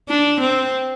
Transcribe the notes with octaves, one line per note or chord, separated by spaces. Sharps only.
D4
C4